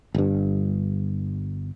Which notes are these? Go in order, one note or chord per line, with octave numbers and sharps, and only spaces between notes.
G1 G2